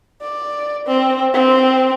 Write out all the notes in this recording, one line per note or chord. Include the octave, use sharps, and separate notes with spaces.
D5
C4
C4